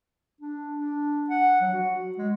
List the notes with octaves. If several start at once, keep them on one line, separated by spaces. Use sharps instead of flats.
D4
D4
F#5
F#3
F#4
G#3